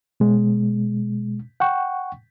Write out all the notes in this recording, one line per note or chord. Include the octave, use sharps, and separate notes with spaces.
B2 G#3
F#5 G5 C#6